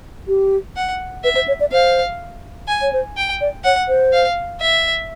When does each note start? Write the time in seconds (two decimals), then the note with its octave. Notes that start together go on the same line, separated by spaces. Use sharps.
0.28 G4
0.76 F#5
1.23 B4 E5
1.35 C5
1.48 C#5
1.60 D5
1.72 C5 F5
2.68 G#5
2.82 C#5
2.93 C5
3.17 G5
3.41 D5
3.64 C#5 F#5
3.88 C5
4.13 F5
4.61 E5